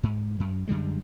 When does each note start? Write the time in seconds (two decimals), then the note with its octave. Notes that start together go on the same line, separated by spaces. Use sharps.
0.03 G#2
0.40 F#2
0.68 F#2 D3 G3 G#3